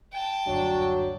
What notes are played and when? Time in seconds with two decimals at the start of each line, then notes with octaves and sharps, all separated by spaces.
0.12 G5 A5
0.47 F#1 D2 G2 F#3 D4